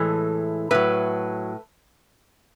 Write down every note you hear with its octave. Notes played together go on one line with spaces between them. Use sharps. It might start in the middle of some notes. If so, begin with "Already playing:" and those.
Already playing: A2 E3 G#3 A4
A2 F#3 B4